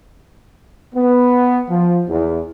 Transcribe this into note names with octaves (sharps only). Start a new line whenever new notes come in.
B3
F3
E2